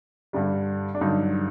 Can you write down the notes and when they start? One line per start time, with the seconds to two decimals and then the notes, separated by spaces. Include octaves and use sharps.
0.33 G2 D3 G3
0.94 D4
1.01 G2 D3 F#3 D#4